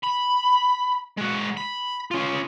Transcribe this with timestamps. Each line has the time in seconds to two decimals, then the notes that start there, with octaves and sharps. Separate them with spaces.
0.04 B5
1.18 G#3 F#4
1.57 B5
2.11 C#4 F4